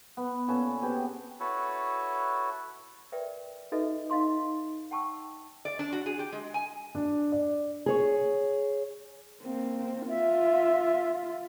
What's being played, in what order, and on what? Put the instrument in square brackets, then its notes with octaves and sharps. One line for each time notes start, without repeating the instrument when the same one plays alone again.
[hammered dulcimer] B3
A#2 B3 C#4 A4
B3 C4 G4 G#4
[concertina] E4 F#4 A4 B4 C#5
[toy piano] A#4 B4 D5 E5 G5
D#4 F#4 A4 B4 D#5 E5
D#4 D#5 F5 C6 D6
F#5 G5 A5 C#6 D6 E6
[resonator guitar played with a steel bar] D5
D4
F#4
G#4
G4
G#3
G#5
[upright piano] D4
D5
[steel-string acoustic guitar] G#4 C#5
[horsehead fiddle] A#3 C4
[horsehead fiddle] F4 [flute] E5